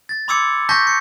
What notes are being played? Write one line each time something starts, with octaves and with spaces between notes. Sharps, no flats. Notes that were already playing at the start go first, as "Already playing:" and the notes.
A6
B5 C6 D6 E6 G#6 C#7
A5 C#6 G6 A#6 B6
C#7